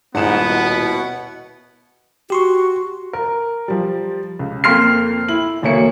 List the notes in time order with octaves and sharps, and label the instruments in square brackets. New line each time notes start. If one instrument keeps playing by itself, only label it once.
[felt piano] D#1 E7 [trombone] G#2 [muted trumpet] B3 [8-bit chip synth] E4 F#5
[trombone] B2
[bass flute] F#4 [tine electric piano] G4 C6 C#6
[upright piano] A#4
F3 G3
C#2
F2 A#3 C6 F6 C7
E4 F#7
E1 D2 A#3 C#5 C#7